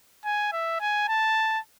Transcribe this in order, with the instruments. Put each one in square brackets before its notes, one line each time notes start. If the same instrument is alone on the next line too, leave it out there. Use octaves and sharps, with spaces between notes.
[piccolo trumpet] G#5
E5
G#5
A5